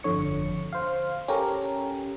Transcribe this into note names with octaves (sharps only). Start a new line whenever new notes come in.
G1 F2 D3 C#5 C#7
C5 F5
C#4 G4 A4 A#4